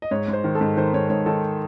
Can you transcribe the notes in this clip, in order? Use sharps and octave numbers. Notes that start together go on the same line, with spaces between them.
D#5
G#2 C#5
G#2
C5
D#3
A4
G#2
D#3 C5
G#2 C#5
G#2 C#5
D#3 A4